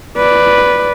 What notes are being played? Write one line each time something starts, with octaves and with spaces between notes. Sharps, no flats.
B4 D5